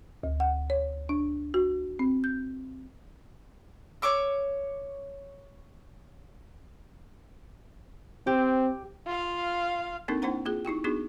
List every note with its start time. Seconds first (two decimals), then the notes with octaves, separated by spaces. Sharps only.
0.23 D2
0.40 F#5
0.70 C#5
1.09 D4
1.54 F#4
1.99 C4
2.24 G6
4.02 C#5 C#6 D6 E6
8.27 C4 G4
9.06 F4 F5
10.08 A#3 C4 D4 D#4 A4 A#4
10.22 A#3 D4 E4 C5 F#5 A#5
10.45 A#3 F4 G#4
10.65 D#4 E4 G4 G5
10.84 B3 D4 D#4 F#4 G#4